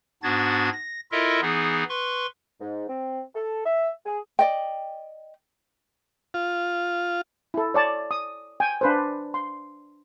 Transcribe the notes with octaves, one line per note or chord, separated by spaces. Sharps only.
G#2 B3 D4 F#4 G#6 A6
A#6
E4 F4 A4 A#4 D#5 E5
E3 B3 D#4 G#4
B4 C6 C#6
G#2
C4
A4
E5
G#4
D5 D#5 G5
F4
E4 A4
C#5 D5 A5
D#6
G5 G#5
D4 B4 C5
C6